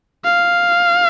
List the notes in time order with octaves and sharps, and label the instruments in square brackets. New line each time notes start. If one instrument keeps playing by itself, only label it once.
[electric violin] F5